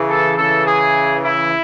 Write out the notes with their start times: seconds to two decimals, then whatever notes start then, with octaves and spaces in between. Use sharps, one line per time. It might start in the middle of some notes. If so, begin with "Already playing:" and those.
Already playing: C#3 E3
0.09 A4
0.37 C#3 E3 A4
0.66 G#4
1.24 E4